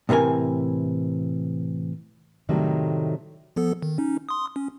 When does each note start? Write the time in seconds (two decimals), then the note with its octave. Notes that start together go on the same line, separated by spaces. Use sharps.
0.09 A2 C3 E3 A#4 G#5
2.49 A2 C3 D#3 F#3 G3 A3
3.56 F3 B3 A4
3.82 D#3
3.98 C#4 D#4
4.29 C6 D#6
4.56 C#4